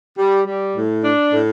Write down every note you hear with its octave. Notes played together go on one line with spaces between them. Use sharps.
G3
G3
A2
D4
A2